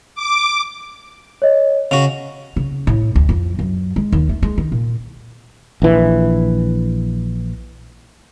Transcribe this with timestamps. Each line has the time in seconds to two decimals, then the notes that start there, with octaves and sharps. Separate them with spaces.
0.15 D6
1.42 C#5 D#5
1.91 C#3 F#4 F7
2.56 C#3
2.87 A2
3.15 D2
3.29 F2
3.59 F#2
3.96 G#3
4.12 D#2
4.29 A3
4.43 G#3
4.58 D#3
4.72 A#2
5.82 A#1 E3